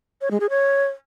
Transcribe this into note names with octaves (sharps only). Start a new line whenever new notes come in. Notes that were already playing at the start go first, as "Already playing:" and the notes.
C#5
G#3
G#4
C#5